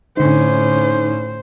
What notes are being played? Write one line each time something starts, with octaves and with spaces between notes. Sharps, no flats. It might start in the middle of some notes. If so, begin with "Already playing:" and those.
A2 D3 C#4 D#4 C5